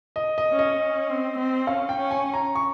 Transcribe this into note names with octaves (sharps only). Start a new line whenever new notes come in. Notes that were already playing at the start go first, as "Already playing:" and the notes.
D#5
D#5
C#4
D#5
C#4
C4
C4
C#4 F5
G5
C#4
G#5
A#5
C#6